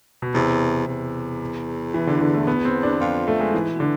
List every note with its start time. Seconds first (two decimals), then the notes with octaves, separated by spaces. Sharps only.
0.22 B2
0.34 E2 C3
0.88 E2
1.94 E3
2.07 D3
2.21 D3
2.34 A3
2.47 B3
2.65 C4
2.83 D4
3.00 F2 F4
3.28 A3
3.41 G#3
3.53 G#2 E3
3.71 B2
3.80 D3